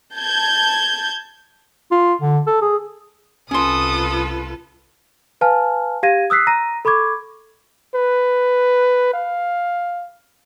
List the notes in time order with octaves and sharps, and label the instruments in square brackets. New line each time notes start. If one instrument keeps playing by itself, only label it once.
[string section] A5 G6 G#6
[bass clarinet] F4
D3
A4
G#4
[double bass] C2 [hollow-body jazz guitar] C#4 C6 [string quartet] F4 A4 B4 [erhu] D#6
[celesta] B4 F5 G#5 A5 F6
G4 F5 G#6 A#6 D#7
D#6 E6 F#6 B6 C7
A#5 A#6 D#7
A4 B5 C#6 D6 G#6
[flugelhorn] B4
F5